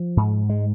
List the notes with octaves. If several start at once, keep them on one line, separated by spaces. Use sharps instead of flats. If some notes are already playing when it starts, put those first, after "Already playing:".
Already playing: F3
G#2
G#3